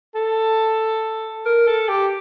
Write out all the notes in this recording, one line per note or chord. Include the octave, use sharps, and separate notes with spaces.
A4
A#4
A4
G4